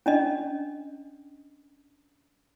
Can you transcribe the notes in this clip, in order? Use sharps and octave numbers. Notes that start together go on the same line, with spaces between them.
C#4 D4 D#5